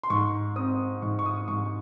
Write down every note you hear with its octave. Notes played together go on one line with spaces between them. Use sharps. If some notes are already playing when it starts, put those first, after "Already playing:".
C6
G#2 C#6
C4 D#6
G#2 C#6
C#6
D#6
G#2 C#6